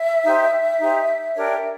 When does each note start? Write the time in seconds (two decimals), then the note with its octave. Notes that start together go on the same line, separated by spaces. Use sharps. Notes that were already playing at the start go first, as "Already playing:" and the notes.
Already playing: E5
0.24 D#4 G4 C5
0.80 D#4 G4 C5
1.35 D4 G4 A#4 C#5